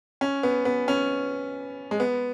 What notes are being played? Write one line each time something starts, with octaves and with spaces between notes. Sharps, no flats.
C#4
B3
B3
C#4
G#3
B3